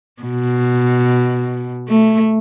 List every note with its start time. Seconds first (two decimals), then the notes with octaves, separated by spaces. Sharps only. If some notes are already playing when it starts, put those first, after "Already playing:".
0.22 B2
1.89 A3